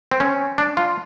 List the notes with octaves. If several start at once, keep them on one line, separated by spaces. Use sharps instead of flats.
C4
C#4
D4
F4